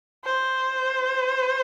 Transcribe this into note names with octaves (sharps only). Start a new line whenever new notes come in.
C5